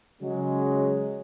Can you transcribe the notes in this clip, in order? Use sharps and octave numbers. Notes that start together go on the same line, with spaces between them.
C#3 F#3 G#3